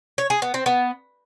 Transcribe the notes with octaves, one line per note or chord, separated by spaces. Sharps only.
C#5
G#4
B3
C4
B3